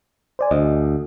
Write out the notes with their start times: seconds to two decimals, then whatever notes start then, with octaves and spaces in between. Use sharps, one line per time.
0.39 C5 D5 G#5
0.51 D2 D#5